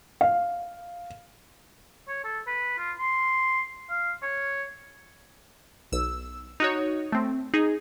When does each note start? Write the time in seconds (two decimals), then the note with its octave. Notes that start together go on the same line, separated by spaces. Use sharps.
0.21 F5
2.08 C#5
2.24 A4
2.47 B4
2.78 F4
2.99 C6
3.90 F5
4.23 C#5
5.92 B1 E6
6.60 D#4 F#4 C#5
7.12 A3 C4
7.54 D#4 G#4